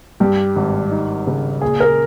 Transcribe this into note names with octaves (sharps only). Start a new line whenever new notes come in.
G2 G4
G#1
D#4
C#3
A#2 G#4
A#4